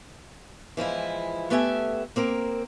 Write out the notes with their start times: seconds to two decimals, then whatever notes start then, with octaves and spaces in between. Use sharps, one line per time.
0.77 E3 F3 G#3 E4
1.50 A3 B3 G4 A4 E5 G#5
2.16 A#3 C4 A#4